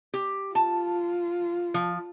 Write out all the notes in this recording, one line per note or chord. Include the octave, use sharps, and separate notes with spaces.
G4
F4 A5
F3